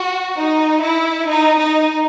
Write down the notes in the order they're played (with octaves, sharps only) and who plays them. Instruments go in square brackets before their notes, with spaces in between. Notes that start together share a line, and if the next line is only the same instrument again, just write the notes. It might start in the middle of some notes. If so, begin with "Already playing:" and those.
Already playing: [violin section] F#4
D#4
E4
D#4
D#4